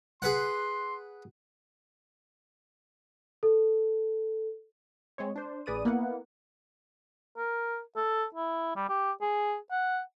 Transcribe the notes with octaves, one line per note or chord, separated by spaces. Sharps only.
G#4 B4 F#5 C6
A4
G#3 C4 C#5
D4 C5
A1 G#4 B4 D5 D#6 D#7
A#3 B3 E4 F#5
A#4
A4
E4
G3
G4
G#4
F#5